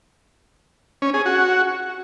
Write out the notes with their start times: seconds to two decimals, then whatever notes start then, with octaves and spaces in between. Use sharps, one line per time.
1.02 C#4
1.14 G#4
1.26 F#4